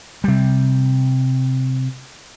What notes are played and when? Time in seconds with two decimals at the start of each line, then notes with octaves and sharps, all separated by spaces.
0.24 C3 G3